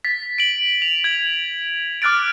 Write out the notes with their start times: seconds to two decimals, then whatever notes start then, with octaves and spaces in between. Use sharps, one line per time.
0.05 A6 B6
0.38 D7 F#7
0.82 F7
1.04 G#6 F#7
2.02 D6 F6 F#6 A6 D7